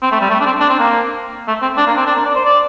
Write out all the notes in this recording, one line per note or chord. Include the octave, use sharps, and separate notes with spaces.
C4
A3
G3
A3
D4
C4
D4
C4
A#3
A3
C4
D4
A#3
C4
D4
A#4
D5
C5
D5